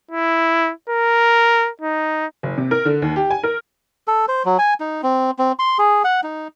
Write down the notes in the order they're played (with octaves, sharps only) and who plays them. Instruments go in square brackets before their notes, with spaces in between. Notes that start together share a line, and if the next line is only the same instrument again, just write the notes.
[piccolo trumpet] E4
A#4
D#4
[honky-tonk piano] F#1
C3
A#4
D3
D#2
G4
G#5
A#4
[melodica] A4
C5
F#3
G#5
D#4
C4
C4
C6
G#4
F#5
D#4